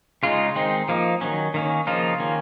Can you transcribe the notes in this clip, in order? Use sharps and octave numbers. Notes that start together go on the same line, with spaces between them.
C#3 G#3 D#4 F4
D#3 G#3 C4 D#4
F3 A#3 D#4
D#3 F#3 C#4
D#3 A#3 C#4
C#3 F3 A#3 D#4 F4
D#3 A#3 C#4